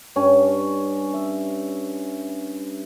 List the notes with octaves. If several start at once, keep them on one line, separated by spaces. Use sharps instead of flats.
G2 C#4 G#5
E5